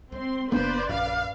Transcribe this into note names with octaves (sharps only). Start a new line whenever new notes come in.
G#3 C4 C6
F#1 C#3 A#3 B3 D4 B4 C5 D5
A#1 F#2 F5